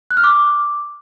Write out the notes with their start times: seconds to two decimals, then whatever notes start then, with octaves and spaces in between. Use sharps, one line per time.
0.11 F#6
0.17 F6
0.24 D6